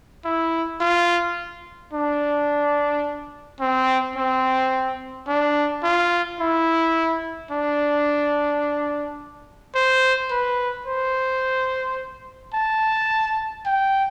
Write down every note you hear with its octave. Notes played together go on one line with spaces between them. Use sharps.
E4
F4
D4
C4
C4
D4
F4
E4
D4
C5
B4
C5
A5
G5